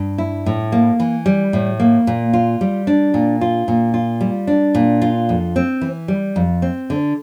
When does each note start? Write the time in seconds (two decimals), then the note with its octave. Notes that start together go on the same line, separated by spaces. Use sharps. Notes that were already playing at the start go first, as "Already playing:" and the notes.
Already playing: G2
0.18 E4
0.46 A2
0.72 A#3
1.00 E3
1.26 G3
1.53 A2
1.80 A#3
2.07 A#2
2.33 F4
2.61 G3
2.87 D4
3.14 A#2
3.41 F4
3.68 A#2
3.94 F4
4.21 G3
4.47 D4
4.75 A#2
5.01 F4
5.29 F2
5.56 C4
5.81 E3
6.08 G3
6.36 F2
6.62 C4
6.90 D3